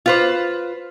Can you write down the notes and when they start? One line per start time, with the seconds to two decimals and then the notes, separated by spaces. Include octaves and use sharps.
0.06 F4 B4 C5